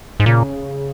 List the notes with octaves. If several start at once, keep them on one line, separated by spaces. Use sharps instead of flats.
G#2
A#2 C#3